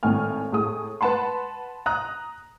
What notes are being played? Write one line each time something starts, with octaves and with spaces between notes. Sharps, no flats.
G#1 A2 G#5 F6
A2 G#4 D#6
B4 F#5 A5 B5 C6
A#5 D#6 F#6